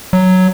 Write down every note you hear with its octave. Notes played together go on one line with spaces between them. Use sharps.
F#3